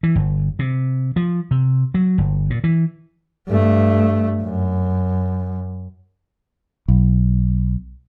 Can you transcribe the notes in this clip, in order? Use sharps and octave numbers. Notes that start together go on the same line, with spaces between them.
E3
G1
C3
F3
C3
F#3
G1
A#2
E3
G2 A3
F#2
B1